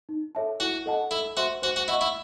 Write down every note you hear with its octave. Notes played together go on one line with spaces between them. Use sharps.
D#4
A4 C#5 E5 A5
E4 F#4
A4 D#5 F#5 A5
E4 A4
F#4 C5 E5 C6
F#4 C5
F#4
E4 D#5 F#5 C#6
E4